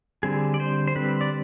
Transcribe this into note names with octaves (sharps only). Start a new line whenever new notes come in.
D3 G3 C4 G#4
D5
C5
C5
D3 G3 C4 B4
D5